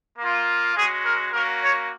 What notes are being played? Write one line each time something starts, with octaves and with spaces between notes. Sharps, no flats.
A#3 F4
G#3 C#4 F#4 G#4
A#4
A#3 C#4 F#4 A#4
C#5